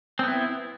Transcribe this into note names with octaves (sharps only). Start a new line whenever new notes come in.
B3 C4 E4